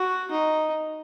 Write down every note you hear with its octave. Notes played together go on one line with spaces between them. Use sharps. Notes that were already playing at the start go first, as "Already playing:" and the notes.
Already playing: F#4
D#4